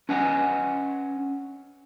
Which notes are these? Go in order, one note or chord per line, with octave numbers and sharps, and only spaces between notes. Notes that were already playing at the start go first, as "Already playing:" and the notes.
C#4 B4 D#5 F#5 G#5